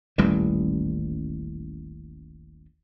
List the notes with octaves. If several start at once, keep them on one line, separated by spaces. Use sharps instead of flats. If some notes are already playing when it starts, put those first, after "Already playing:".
D#1 A1 E3 G3